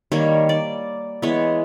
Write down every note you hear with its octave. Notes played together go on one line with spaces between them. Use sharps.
D#3 G3 A#3 C#5
D5
E3 G#3 B3 C#5